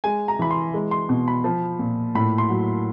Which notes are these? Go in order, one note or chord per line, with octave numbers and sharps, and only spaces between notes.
G#3 G#5
A#5
E3 B5
C6
G#3
C6
B2
B5
F3
A#2
A2 B5
C6
F#3